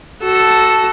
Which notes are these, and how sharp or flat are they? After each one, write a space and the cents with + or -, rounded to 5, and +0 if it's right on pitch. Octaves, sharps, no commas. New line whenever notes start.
F#4 +15 A4 +0